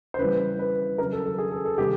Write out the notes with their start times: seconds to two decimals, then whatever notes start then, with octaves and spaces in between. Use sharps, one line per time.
0.14 C5
0.18 C#3 E3 G3 B4
0.59 B4
0.98 C#3 F#3 A#4
1.12 A4
1.25 A4
1.38 G#4
1.51 A4
1.65 A4
1.78 C3 D#3 G3 G4